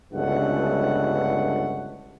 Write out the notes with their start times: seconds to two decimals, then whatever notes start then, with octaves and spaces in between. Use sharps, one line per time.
0.13 G1 C#2 G2 E3 A3 F#5